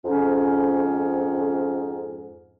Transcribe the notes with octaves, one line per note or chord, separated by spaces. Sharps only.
F2 G#2 C#4